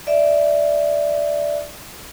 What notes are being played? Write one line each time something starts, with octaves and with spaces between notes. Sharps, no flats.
D5 E5